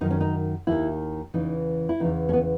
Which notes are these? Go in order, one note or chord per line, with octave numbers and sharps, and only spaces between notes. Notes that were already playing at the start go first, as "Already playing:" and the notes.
F#2 D#3 D#4
C#4
D#4
D#2 D#3 E4
E2 C#3 E3 D#4
E4
E2 C#3 E3 D#4
C#4
B3